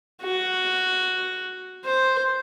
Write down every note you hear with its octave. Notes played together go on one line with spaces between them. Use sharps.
F#4
C5